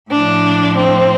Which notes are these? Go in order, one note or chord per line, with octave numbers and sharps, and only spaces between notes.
A2 F3 D4
C4